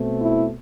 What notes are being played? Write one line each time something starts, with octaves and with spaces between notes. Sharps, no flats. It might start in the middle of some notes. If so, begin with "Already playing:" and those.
Already playing: B2 A3 C4
E4